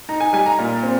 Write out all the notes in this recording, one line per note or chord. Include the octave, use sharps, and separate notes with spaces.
D#4 A#5
G#5
G3 G#5
A#5
A#2
C4